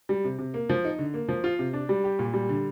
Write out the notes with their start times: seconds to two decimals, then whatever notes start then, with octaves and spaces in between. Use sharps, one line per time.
0.09 G3
0.24 C3
0.39 C3
0.54 A#3
0.69 F3
0.85 D#4
0.99 D3
1.14 A#3
1.28 F3
1.44 F4
1.59 C3
1.73 D4
1.89 G3
2.04 G4
2.19 A#2
2.34 G3
2.49 D3